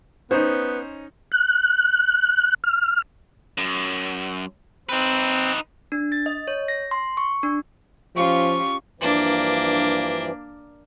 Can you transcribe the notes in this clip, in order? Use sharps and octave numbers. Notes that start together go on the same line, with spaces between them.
B3 C#4 D#4 C5
F#6
F6
F#2
C4 D#4 B4
D4
A6
D#5
C#5
A#6
C6
C#6
D4
F3 C#4 F4 G4 C#6
G2 E3 F3 A#3 D4